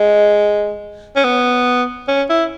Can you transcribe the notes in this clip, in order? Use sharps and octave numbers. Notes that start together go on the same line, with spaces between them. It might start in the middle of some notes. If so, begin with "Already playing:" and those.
Already playing: G#3
C#4
B3
C#4
E4